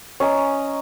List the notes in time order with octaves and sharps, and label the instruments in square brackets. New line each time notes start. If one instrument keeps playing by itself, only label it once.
[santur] C#4 D#5 A#5